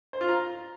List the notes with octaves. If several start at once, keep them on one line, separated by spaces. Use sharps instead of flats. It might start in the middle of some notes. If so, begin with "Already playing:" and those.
C5
F4
A#5